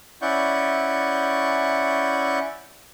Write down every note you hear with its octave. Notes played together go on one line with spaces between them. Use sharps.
C#4 E4 D5 F#5 C#6 G6